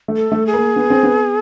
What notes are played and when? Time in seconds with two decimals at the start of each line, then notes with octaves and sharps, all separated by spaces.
0.08 A3
0.16 A4
0.32 A3
0.46 G#4
0.53 A#3
0.76 B3
0.90 C4
1.03 B3